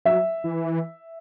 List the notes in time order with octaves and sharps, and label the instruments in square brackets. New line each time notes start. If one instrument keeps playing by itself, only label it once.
[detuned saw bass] F#3 [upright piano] E5
[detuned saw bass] E3